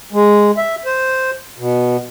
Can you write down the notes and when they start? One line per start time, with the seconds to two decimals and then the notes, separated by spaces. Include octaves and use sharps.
0.13 G#3
0.57 E5
0.86 C5
1.59 B2